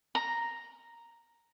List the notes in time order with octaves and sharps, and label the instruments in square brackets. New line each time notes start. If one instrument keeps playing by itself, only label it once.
[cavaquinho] A#5